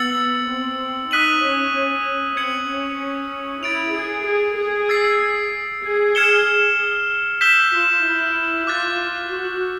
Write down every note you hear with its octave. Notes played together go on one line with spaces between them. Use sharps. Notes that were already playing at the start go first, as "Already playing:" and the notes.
Already playing: B3 E6 A6 C#7 F#7
C4
D#4 D#6 F#6 B6 D#7 F#7
C#4
C#4
C4 G#6 C#7 F#7
C#4
E4 A6 D7 F7
G#4
G#4
G#4
E6 A6 C7
G#4
F6 G#6 C#7 E7 G7
E6 G6 B6 E7 G7
F4
E4
F4 D6 F#6 A6
F#4